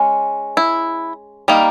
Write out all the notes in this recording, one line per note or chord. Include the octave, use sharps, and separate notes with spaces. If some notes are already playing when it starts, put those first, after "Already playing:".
Already playing: G#3 C#4
E4
G3 A#3 D#4